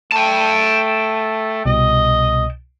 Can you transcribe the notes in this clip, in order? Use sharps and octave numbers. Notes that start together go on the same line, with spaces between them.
A3 G5 A5
C2 B2 D#5